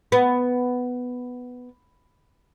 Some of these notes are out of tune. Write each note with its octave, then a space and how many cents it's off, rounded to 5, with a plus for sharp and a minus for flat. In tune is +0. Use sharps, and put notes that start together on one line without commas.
B3 +5